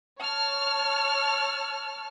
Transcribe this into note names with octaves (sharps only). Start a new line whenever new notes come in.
C#5 A5 F6